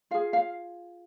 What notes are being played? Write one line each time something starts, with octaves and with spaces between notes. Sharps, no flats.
F4 G#4 F5
F5